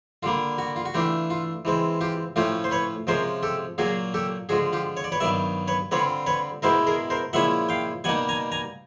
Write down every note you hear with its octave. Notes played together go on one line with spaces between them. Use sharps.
D3 G3 A#3 F4
F#4
F4
F#4
E3 A3 D4 F4 G4
F4
E3 G#3 C4
F4 G4
A2 F3 A3 C#4 F4 G4
C5
B4 C#5
C3 F3 G#3 C#4 A#4 C5
G4 A4
A#2 F#3 A#3 F#4 G#4
G4 A4
D3 F3 G#3 F#4 G#4
F4 G4
C#5
D5
B4 C#5
G2 D#3 F#3 B3 D5 E5
B4 C#5
D3 G3 C4 F4 B4 C#5
B4 C#5
B2 G#3 B3 E4 A#4 C5
G#4 A#4
A#4 C5
A#2 F3 G#3 C#4 E4 E5 F#5
F5 G5
B2 G3 A#3 D#4 F#5 G#5
G#5 A#5
G#5 A#5